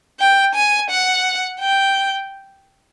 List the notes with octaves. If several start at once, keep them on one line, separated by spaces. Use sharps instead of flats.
G5
G#5
F#5
G5